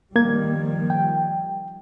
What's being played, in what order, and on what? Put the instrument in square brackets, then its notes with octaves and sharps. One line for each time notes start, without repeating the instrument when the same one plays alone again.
[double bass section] D#3 F3 G3 [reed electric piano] A#3 G#6
[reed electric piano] G5